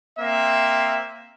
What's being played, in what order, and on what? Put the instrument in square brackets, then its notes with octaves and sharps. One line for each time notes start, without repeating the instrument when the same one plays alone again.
[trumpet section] A#3 C4 E5